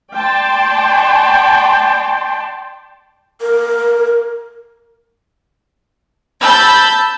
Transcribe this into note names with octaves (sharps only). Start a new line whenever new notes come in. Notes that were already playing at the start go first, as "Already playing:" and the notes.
D5 G5 A5 C6
A#4
A5 B5 E6 G6